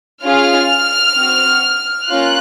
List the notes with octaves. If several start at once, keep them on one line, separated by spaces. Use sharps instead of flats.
C#4 F4 G#4 F6
C4 F#4
A#3 C#4 F4 F#6